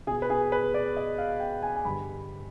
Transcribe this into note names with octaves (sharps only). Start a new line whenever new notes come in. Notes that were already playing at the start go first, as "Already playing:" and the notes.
B2 B3 G#4
B4
G#4
B4
D5
D#5
F5
G5
G#5
G#5
G2 D3 G3 B5